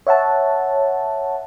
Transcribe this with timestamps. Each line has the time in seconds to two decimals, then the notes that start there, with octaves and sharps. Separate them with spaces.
0.07 C#5 E5 F#5 A5